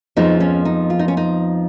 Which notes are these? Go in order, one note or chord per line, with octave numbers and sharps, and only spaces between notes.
F2 F3 G#3 B3 D#4
C#4
D#4
F4
D#4
C#4
D#4